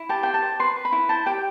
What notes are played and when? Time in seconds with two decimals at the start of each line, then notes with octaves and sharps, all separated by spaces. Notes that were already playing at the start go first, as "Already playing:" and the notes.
Already playing: E4
0.09 G4 A5
0.23 C5 G5
0.34 A5
0.42 C5
0.59 B4 C6
0.76 B4
0.85 B5
0.92 E4
1.09 C5 A5
1.26 G4 G5